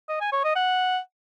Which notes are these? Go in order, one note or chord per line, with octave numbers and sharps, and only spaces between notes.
D#5
G#5
C#5
D#5
F#5